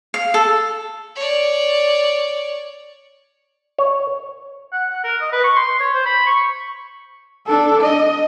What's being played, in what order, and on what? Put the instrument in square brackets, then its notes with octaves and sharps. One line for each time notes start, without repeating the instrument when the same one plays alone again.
[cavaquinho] F5
A4
[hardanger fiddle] C#5 D5
[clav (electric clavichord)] C#5
[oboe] F#5
F#5
A#4
D#5
B4
C#6
C6
C#5
C5
B5
C#6
[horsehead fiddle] D4 A4
D#5